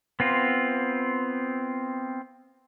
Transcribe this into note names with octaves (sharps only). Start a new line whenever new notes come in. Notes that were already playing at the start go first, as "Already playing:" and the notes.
B3 C4 F4